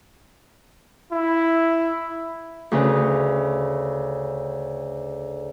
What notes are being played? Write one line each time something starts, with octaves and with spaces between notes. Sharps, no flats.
E4
D2 C#3 B4